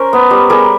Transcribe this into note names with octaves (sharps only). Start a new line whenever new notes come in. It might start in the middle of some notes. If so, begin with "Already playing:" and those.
Already playing: C#4 A#4 C5
B3
G3
G3 G#4 A#4